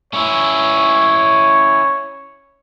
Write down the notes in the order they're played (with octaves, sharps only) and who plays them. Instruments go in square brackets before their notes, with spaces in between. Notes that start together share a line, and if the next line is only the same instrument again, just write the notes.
[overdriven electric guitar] C#4 E4 [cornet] C#5